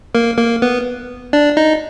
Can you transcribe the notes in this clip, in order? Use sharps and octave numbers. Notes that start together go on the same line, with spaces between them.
A#3 A#4
A#3 A#4
B3 B4
D4 D5
D#4 D#5